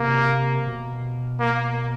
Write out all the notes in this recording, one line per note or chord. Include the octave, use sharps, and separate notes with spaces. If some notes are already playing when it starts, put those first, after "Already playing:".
Already playing: C3 A#3
B2
A#3